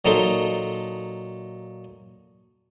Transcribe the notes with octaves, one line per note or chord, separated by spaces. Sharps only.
A#2 F#3 D#4 A4 C6